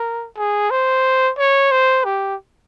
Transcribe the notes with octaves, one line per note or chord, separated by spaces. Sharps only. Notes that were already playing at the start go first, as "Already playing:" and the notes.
Already playing: A#4
G#4
C5
C#5
C5
G4